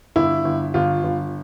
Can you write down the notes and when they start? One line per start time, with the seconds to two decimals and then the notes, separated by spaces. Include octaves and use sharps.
0.16 G1 E4
0.45 G1
0.74 G1 F4
1.04 G1